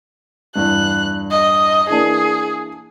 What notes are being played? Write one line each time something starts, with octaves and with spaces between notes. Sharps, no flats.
E2 G2 F#6
D#5
E3 A#3 D4 G#4